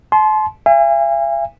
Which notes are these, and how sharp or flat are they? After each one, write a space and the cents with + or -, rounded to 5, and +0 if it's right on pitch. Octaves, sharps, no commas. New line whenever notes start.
A5 -40 C6 +0
E5 +45 G#5 -35